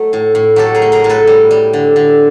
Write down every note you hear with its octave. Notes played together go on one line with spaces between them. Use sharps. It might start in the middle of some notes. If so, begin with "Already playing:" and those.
Already playing: F#3 A3
A2
A2
F#3 G4 A4
G#4 A#4
A3
G#4 A#4
A2
A4 B4
G3
G3
D3
D3